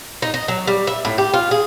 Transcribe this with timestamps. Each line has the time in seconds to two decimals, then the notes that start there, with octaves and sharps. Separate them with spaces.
0.22 D#4
0.34 D#5
0.48 F#3
0.67 G3
0.87 E5
1.05 A2
1.18 G4
1.34 F4
1.51 G#4